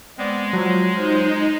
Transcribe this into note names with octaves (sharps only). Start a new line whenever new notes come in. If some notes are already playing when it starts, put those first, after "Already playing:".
G#3 B3 C4 D5
F3 F#3
D#4 F4 C5